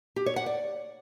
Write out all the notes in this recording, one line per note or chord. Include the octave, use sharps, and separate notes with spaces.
G4
C#5
F#5
D5